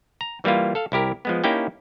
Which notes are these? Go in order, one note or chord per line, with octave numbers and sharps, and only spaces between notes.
A#5
E3 G3 A#3 E4 F4
A4 F5
C2 E4 G4 A#4
F3 G#3 B3
A#3 C#4 D#4 E4 G4 G5